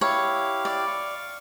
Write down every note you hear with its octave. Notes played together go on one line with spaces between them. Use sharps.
E4 G4 C#5 F5
D5
F5 C#6